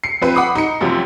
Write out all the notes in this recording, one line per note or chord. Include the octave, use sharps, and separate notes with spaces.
C7 C#7
F3 C4 B4
F#5 B5 D6 D#6
D#4 C#7
F#2 C3 F3 F#3